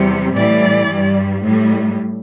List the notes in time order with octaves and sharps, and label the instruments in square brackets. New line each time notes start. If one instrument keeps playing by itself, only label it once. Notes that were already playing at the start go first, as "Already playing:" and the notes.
Already playing: [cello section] E2 C3 G3
A2 E3 G3 D5
G2 G3
A2 G3